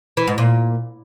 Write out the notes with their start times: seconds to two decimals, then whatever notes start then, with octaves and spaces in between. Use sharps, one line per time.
0.17 E3
0.27 G#2
0.38 A#2